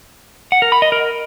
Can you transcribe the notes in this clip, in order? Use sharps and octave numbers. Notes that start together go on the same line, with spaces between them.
F#5
A#4
B5
D#5
A#4